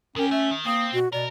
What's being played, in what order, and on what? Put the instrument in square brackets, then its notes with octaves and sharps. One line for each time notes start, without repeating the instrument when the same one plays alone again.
[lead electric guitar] D#3 G4 [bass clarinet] C#4 [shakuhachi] A#4
[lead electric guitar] A3 [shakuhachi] E5
[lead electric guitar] D#3
[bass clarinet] A#3 [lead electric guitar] C4 [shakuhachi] D#6
[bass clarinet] B2 [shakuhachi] F#4
[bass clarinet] B2 [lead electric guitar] A#4 [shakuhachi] D5